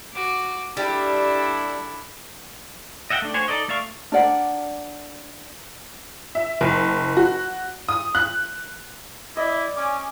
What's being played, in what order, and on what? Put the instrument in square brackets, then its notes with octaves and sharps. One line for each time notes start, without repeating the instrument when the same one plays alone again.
[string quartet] F#4 D6
[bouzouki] G3 [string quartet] D4 E4 A4
[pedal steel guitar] D#5 E5 F#5 G5
A3 D4
F#4 C5 C#5 G#5
D#4 A4 D5 D#5
A3 D5 E5 F5 C#6
[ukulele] D4 A#4 D5 F#5
[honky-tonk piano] E5
F#1
F#4
D#6
F#6
[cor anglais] E4 [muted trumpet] D5 [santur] D#5
[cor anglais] C#4 [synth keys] G#5 D6